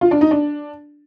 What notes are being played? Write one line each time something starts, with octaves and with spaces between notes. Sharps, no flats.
F4
D4
D#4
D4